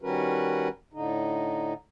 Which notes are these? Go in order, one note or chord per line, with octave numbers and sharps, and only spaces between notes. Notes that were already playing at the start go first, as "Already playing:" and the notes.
D#3 G3 C#4 F#4 A#4 B4
A2 D3 D#4